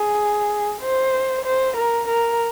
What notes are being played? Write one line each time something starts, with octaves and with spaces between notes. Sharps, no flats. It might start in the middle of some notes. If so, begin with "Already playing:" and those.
Already playing: G#4
C5
C5
A#4
A#4